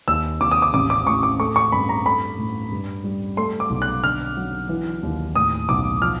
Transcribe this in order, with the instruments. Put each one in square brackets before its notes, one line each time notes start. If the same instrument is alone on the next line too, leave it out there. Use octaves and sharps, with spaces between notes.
[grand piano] D#2 E6
D#2 D6
D#6
D6
A1 D6
D6
A2 C#6
D6
A3 C#6
C#6
G2 B5
A#5
A3 B5
A2
G2
G3
A3 C6
D6
B1
F#6
D3 F6
F#3
E3
D#2
A2 D#6
B1 D6
F3 F6